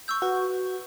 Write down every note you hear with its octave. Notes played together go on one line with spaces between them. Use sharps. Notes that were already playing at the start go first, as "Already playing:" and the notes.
C#6 E6 G6
F#4 B4